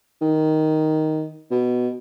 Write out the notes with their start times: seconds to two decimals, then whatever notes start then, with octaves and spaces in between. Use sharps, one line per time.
0.21 D#3
1.51 B2